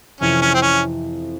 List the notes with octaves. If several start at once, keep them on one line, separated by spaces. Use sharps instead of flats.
F2 C3 E3 C#4
C#4
C4
C#4